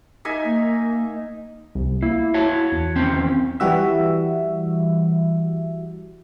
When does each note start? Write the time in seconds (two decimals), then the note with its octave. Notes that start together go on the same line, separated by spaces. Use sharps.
0.25 D#4 E5 G#5
0.44 A#3
1.75 C2
2.02 A#3 E4
2.34 F#4 C#5 A5
2.72 E2
2.96 D#2 C4 C#4
3.60 E3 G3 F#4 E5